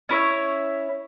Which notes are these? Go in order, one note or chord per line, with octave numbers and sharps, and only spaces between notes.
C#4 E4 C#5 E5